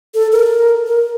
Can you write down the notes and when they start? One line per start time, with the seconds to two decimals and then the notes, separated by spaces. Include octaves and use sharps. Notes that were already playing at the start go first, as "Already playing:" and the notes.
0.14 A4
0.32 A#4
0.87 A#4